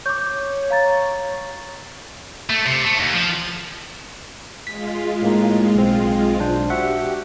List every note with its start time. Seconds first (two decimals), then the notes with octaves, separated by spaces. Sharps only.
0.06 C#5 D6 G6
0.70 F5 A#5 A6
2.50 A3
2.66 C3
2.85 A3
2.98 D#2
3.13 F3
4.67 G#3 F4 B6
5.22 A2 A#3 D#4
5.75 B1 C4
6.39 B1 D4 C5
6.70 F#4 G4 E5 F#5